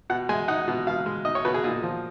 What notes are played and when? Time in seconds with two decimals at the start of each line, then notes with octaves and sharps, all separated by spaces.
0.10 B2 F#5
0.29 G#3 G#5
0.48 D#4 F#5
0.68 B2
0.87 B2 F5
1.06 G#3
1.25 D#4 D#5
1.35 C#5
1.45 B2 B4
1.54 G#4
1.64 A#2 D#4
1.83 F3